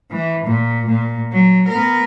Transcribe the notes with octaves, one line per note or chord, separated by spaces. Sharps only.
E3
A#2
A#2
F#3
B3 A#4